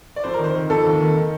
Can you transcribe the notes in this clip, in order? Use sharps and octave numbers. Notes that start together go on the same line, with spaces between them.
D5
F2 C5
A#4
D#3 C5
D#3
F2 A4
D#2
D#3
D#3